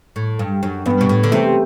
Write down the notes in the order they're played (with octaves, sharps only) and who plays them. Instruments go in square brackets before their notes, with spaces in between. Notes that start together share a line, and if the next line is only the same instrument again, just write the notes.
[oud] A2
G2
F#2
[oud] G2 [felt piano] B3
[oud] B2
A2
D3
[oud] C3 [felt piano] A3